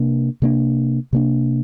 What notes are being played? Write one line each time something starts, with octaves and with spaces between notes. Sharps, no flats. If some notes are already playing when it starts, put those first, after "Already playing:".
Already playing: C3 A#3 D4
C3 A#3 D4
C3 A#3 D4